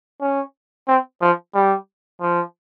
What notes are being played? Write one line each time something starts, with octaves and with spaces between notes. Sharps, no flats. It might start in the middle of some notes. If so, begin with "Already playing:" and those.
C#4
C4
F3
G3
F3